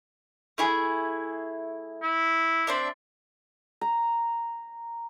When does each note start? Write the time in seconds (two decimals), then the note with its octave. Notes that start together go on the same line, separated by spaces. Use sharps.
0.58 A3 E4 G#4
2.03 E4
2.67 C4 D4 E5
3.81 A#5